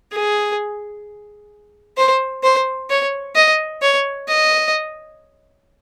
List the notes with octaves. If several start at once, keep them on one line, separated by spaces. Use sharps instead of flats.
G#4
C5
C5
C#5
D#5
C#5
D#5